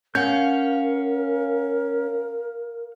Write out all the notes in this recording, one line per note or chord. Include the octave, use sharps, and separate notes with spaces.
C#4 A#4 F5 F#5 G6